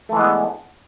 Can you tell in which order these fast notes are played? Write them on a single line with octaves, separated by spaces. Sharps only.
A3 E3 G#3 B3 D4